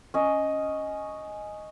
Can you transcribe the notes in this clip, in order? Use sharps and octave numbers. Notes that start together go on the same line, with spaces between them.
C#4 D#5